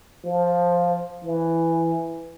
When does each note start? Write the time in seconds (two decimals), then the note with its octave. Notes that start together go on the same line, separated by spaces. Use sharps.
0.25 F3
1.25 E3